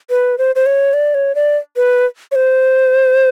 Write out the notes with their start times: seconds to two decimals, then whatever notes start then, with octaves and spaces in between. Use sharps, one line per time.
0.10 B4
0.38 C5
0.55 C5
0.66 C#5
0.93 D5
1.14 C#5
1.35 D5
1.76 B4
2.32 C#5
2.35 C5